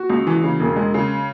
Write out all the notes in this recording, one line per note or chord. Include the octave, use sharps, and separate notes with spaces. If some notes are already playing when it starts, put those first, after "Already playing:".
Already playing: F#4
C#2
E3
C#3
E1
G#3
C#3